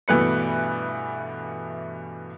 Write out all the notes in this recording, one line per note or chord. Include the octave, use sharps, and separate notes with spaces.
G2 B2 E3 A3 B4 C#7